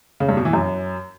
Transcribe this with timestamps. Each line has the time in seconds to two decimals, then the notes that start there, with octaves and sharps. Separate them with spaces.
0.20 C#3
0.29 G2
0.37 B2
0.45 E3
0.53 F#2